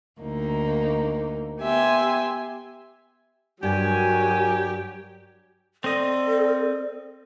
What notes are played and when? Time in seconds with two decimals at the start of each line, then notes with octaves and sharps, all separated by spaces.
0.21 D2 A#3 D#4
1.61 B3 G4 E5 G#5 C6
3.63 G2 F#3 F#4 G4 A#4 G#5
5.84 C4 A4 D5 D#5